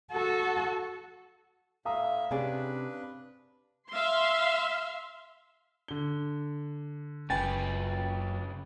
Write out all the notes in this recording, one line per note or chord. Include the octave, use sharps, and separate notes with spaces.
F#4 A4
A2 E5 F5 A#5 D#6
C3 C#4 D4 G#4 B4 D5
E5 F5 C6
D3 G7
F#1 C#3 B4 G5 G#5 A6